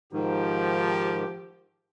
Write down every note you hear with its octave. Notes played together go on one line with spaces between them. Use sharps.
G#2 D#3 F3 G4